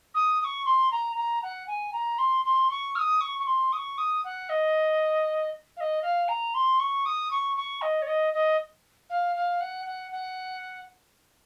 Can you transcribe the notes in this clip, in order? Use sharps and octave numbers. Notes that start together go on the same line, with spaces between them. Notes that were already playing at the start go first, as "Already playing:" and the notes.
D#6
D#6
C#6
C6
A#5
A#5
F#5
G#5
A#5
C6
C6
C#6
F6
D#6
C#6
C#6
C6
D#6
C#6
D#6
F#5
D#5
F5
D#5
F5
A#5
C6
C#6
D#6
C#6
C#6
D#5
C#5
D#5
D#5
F5
F5
F#5
F#5
F#5